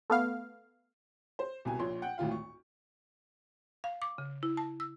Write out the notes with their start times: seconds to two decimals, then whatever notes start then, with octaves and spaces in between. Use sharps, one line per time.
0.10 A3 B3 F5
1.39 C5
1.65 C2 B2 G#5
1.79 A#1 A#2 C#5 C6
2.02 F#5 G5
2.18 G#1 D2 A2 F4 F5
2.31 C#6
3.84 F5
4.02 D6
4.18 C#3
4.43 E4
4.57 A5
4.80 E6